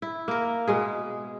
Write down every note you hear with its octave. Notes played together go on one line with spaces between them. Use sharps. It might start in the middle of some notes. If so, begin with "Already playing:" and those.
E4
A#3 A#4
B2 G#3 G#4